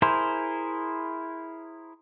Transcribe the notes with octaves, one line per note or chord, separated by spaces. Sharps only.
E4 G#4 A#4 C5